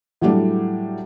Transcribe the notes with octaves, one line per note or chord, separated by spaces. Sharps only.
A2 F#3 G3 D4